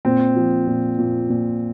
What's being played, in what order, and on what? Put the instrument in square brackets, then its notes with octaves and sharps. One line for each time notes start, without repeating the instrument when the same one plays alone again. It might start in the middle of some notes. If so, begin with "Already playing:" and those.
[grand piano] A#2 C4
F3
A#2
A#2
A#2